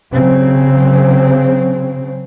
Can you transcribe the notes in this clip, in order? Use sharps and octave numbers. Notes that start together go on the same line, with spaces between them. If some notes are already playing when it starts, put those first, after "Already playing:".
C#3 F#3 C4